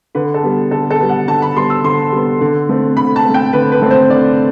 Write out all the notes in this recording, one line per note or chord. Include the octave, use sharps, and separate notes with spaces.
D3 B4
A4
G3 B3
D3 A4
A4
G3 B3
F#5
D3 A5
B5
G3 B3 C6
E6
D3 C6
G3 B3
D3
A3 C4
D3 B5
A5
A3 C4
G5
D3 B4
B4
A3 C4
C5
D3 D5